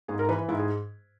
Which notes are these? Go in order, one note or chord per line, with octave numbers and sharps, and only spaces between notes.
G#2 G#4
A#4
E3 B4
G#2 E4
G#4